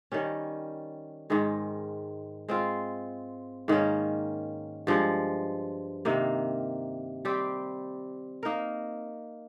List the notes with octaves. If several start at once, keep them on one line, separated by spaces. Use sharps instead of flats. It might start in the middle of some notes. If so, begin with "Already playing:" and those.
D#3 G3 C#4
G#2 D#3 G#3
G#3 C4 F4
G#2 D#3 A#3 C#4
G2 F3 G#3
C3 D#3 A#3
G3 C4 G4
A#3 D#4 A#4